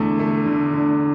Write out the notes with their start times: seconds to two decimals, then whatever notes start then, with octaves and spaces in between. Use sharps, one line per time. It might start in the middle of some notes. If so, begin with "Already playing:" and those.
Already playing: E2 D3 A3
0.19 A3
0.46 D3
0.74 D3